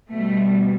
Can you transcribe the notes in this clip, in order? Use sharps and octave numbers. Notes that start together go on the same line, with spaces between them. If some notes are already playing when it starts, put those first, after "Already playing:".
B2 G3 A3